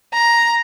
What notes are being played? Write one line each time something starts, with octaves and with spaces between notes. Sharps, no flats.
A#5